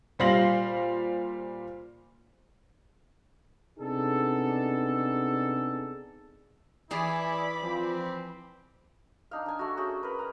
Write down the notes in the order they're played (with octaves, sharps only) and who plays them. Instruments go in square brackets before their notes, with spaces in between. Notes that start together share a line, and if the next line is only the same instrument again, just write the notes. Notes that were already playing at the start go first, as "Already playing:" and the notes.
[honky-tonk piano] A#2 G3 C5 F5 A#6 F#7
[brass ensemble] C3 B3 D4 D#4 G#4 A4
[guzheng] E3 G#4 [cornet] E4 [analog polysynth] D5 [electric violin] B5 D6
[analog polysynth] F3 [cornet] C4
[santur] D4 D#4 F5
D4 G#5
A3 F#4
C#4 F#4 G#4 G5
A#4 B4
B4 A#5